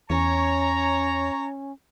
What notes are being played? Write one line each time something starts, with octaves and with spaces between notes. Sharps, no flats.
E2 C#4 C#5 A#5